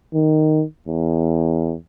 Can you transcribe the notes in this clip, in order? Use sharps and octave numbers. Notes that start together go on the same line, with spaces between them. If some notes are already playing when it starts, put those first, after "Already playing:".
D#3
E2